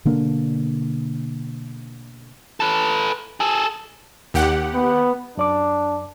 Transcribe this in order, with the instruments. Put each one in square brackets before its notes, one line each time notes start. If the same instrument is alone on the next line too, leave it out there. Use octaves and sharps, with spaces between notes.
[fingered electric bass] B2 D3 A#3 D4
[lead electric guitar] A4 B4
G#4 A4
[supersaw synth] D#2 G4 F#5
[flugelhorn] B3
[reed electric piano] F#2 D5 D6 [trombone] D4